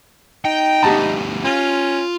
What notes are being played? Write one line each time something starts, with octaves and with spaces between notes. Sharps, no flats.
D#4 G5
D2 B3 G4 A5 A#5
C#4 F4